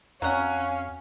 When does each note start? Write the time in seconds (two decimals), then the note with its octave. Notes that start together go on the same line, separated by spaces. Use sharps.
0.22 F2 F#3 C#4 F5 F#5